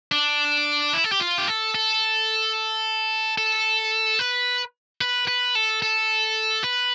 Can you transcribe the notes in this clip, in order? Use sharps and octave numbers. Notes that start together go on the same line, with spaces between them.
D4
E4
A4
G4
F4
G4
A4
A4
A4
B4
B4
B4
A4
A4
B4